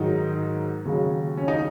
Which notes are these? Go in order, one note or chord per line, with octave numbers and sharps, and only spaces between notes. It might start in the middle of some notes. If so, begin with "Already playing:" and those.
Already playing: G#2 D#3 F#3 D#4
D#2 C#3 F#3
C#4
D#4